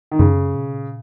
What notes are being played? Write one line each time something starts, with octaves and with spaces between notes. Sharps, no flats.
D#3
F#2 C#3
A#2
B2
A#2